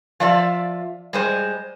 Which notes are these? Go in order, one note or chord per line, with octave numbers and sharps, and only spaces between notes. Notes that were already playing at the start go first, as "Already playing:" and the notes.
F3 F4 D5 E5
G3 G#3 C5